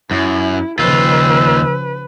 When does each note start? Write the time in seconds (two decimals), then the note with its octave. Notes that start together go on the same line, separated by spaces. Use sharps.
0.11 F#2 E4
0.79 D#2 C#3 F3 F4 B4 E6